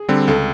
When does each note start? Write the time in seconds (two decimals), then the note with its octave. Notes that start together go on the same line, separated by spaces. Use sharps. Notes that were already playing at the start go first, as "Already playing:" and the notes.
Already playing: G#4
0.08 D3 G3 C4
0.28 C#2 A4